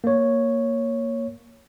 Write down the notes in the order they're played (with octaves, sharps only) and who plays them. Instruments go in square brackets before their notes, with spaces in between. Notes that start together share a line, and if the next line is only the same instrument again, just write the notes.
[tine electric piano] A#3 C#5